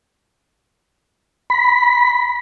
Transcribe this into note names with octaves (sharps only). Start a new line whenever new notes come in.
B5